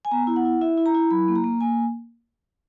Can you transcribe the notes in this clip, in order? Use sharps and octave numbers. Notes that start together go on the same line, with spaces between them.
G#5
B3 A#5
E4
F#5
E4
E4 E5
E4
A#5
E4
F#3 B5
A#3
A#5
A#3
A#3 G#5